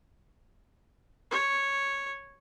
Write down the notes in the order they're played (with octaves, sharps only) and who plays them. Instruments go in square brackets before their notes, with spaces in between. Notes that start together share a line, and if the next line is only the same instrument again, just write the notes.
[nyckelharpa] C#5